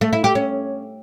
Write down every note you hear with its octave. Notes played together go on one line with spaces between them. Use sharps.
A3
E4
G4
C#4